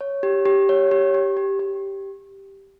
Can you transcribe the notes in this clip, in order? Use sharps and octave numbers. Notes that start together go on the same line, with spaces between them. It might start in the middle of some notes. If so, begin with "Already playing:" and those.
C#5
G4
G4
C#5
G4
G4
G4
G4